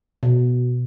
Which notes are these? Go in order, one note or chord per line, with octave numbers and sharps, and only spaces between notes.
B2